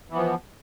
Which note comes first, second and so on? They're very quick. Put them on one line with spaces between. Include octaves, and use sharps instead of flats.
E3 B3 F3